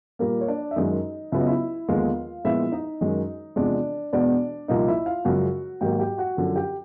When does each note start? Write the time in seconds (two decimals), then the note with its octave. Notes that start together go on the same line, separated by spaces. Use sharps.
0.19 A#2 G3 A#3 A#4
0.41 C#5
0.48 D4 D5
0.71 E5
0.76 F#2 D#3 G#3 D#4 D#5
1.32 C#2 C#3 F#3 B3 E5
1.40 D#5
1.47 E4 E5
1.88 D#2 D3 F3 G#3 B3 F4 F5
2.45 A#2 F3 G#3 B3 E4 E5
2.72 D#4 D#5
3.01 F#2 D#3 G#3
3.56 E2 C3 F3 G#3 D4 D5
4.13 E2 B2 G#3 B3 D4 D5
4.68 C2 A#2 F3 A#3 D#4 D#5
4.88 E4 E5
5.06 F4 F5
5.25 F#2 C#3 F3 G#3 F#4 F#5
5.81 G#2 D#3 F#3 A#3 G4 G5
5.99 G4 G5
6.18 F#4 F#5
6.37 F#2 D3 F3
6.56 G4 G5